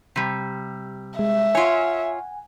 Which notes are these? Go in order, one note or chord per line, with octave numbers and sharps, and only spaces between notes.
C3 G3
G#3 E5
F4 C#5 F#5 G#5